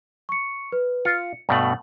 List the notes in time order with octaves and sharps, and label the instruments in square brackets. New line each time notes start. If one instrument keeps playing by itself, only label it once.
[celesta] C#6 C#7
B4
[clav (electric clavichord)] F4 [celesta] C#7
[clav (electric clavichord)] G2 B2 A3 [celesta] F#5 F#7